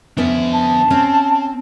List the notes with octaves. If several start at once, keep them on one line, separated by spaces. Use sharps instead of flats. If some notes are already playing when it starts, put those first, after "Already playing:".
F2 B3 C#4 D4 E5
A5
C4 C#4